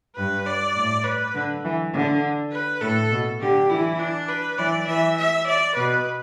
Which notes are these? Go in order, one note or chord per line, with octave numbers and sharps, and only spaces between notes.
G2 B4
D5
A2
B4
D3
E3
D3
B4
A2 A4
B2
D3 G4
E3 E4
D4
B4
E3 D5
E3 E5
E5
D5
B2 B4